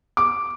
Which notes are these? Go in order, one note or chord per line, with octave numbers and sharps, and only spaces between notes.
D6